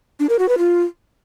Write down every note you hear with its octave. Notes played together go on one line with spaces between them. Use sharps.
D4
A#4
F#4
B4
F4